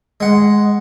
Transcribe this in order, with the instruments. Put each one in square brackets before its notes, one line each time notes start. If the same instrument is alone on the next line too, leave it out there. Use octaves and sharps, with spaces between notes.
[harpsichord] G#3 F#5